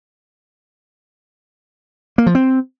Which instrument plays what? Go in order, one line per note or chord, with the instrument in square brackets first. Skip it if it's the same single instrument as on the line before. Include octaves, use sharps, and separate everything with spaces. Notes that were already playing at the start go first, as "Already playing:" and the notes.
[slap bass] A#3
F3
C4